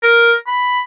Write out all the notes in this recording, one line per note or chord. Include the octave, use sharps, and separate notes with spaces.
A#4
B5